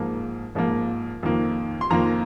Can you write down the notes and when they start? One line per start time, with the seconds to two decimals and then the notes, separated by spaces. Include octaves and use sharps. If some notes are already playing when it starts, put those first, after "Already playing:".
Already playing: G#2 F3 A#3
0.55 G#2 F3 A#3
1.23 F2 D#3 A#3
1.81 C6
1.90 F2 D#3 A#3 A#5